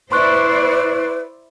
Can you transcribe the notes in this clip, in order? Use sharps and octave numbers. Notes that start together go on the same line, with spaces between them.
E4 B4 C5 D5 C6 C#6 F#6